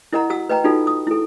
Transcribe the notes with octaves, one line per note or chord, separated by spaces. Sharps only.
E4 A#4 D#5 F#5 A#5
F#4 F#5 E6
B4 D#5 G5 A#5
D#4 F4 F#4 A4
D#6
E4 A4